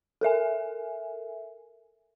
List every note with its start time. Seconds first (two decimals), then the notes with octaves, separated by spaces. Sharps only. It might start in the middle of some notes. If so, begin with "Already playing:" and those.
0.21 A4 A#4 E5 G#5